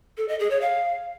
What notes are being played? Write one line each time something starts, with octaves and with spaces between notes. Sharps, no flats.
A4
D#5
G#4
C#5
F5